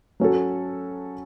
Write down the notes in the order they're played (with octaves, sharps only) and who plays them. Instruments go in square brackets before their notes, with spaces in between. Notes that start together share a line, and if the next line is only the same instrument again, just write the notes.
[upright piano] F#3 C#4 F#4 A4